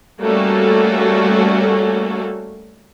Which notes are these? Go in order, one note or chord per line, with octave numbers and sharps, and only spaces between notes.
G3 A3 A#3 C#4 F#4 A4